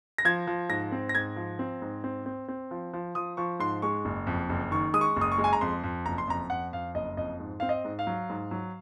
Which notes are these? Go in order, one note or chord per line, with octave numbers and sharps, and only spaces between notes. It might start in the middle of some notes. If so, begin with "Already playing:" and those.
A#6
F3 G#6
F3
G#2 A#6
C4
A#6
G#2 G#6
F3
C4
G#2
C4
C4
C4
F3
F3
F3 D#6
F3 C#6
G#2 C6
G#3 C#6
F#1
F2
F#1
D#3 C#6
G#3 D#6
C#6
F#1
D#6
C#6
G#3
G#5
A#5
F2 C6
F2
F#1 A#5
C6
F2 A#5
F2 F#5
F2 F5
F#1 D#5
F2 D#5
G#2
C4 F5
D#5
G#2
F5
F#3
G#2
F#3